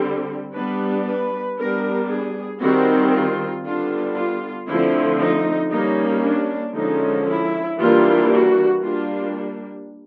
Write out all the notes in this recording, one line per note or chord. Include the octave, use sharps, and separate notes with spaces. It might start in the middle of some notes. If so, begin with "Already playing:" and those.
Already playing: D3 G3 C4
G3 B3 D4 B4
B4
G3 B3 D4 A#4
G#4
D#3 G3 C4 F#4
F4
D3 G3 B3 D4 F4
F4
D3 F3 A3 C4 E4
D#4
G3 A#3 C#4 D#4
D4
D3 F3 G#3 C#4 D#4
E4
E3 G3 A#3 D4 F4
F#4
G3 A#3 D4 F4